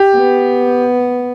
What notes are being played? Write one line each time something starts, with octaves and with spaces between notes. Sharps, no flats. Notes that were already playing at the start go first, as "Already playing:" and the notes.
Already playing: G4
B3